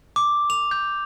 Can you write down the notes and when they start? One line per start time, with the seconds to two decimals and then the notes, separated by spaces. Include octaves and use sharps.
0.16 D6
0.50 F7
0.71 G6